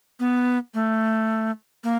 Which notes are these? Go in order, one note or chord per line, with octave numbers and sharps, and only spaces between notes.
B3
A3
A#3